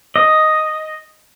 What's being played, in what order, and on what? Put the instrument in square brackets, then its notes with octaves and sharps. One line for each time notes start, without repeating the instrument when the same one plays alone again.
[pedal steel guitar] D#5